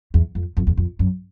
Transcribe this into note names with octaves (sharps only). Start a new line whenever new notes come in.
E2
F2
F2
E2
F2
F#2